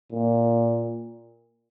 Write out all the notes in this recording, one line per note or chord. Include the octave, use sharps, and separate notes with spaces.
A#2